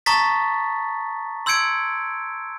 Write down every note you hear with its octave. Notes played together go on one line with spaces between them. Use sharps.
A5 A#5 C#6 D#6 A6 B6
C6 E6 G6 G#6 C#7 D7